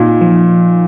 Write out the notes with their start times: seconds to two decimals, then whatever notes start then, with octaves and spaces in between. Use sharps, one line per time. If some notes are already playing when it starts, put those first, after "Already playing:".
Already playing: A#2 D#4
0.21 F3